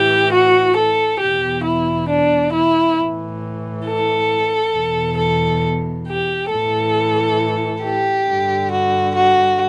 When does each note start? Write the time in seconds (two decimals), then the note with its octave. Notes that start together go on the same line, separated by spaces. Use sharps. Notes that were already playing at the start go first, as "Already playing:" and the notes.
Already playing: A2 E3 G4
0.32 F#4
0.76 A4
1.20 E2 B2 G4
1.64 E4
2.08 D4
2.53 E4
2.97 A2 E3
3.85 A4
4.74 E2 B2
5.18 A4
6.07 G4
6.50 A2 E3 A4
7.83 G4
8.27 G2 D3
8.71 F#4
9.15 F#4